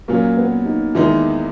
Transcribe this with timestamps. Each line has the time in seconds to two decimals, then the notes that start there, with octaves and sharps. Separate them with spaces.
0.08 A#2 F#3 A#3 C#4
0.37 B3
0.65 D#4
0.95 E2 D#3 G#3 B3 D#4 E4